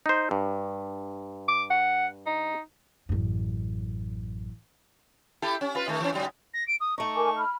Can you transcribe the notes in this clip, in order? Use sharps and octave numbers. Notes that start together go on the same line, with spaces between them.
D#4 C5
G2
D6
F#5
D#4
A1 F#2
E4 G4 A4
C#4
F4 B4
D#3 A3
E3 C#4
G#2 C#3 F#3
A#6
D7
D#6
A3 D#4 C#6
A#4 G#5 D6
B5 F6